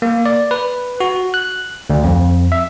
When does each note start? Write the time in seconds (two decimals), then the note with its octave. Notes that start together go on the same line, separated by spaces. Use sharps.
0.02 A#3
0.26 D5
0.51 B4
1.00 F#4
1.34 F#6
1.90 D2
2.04 F2
2.52 E5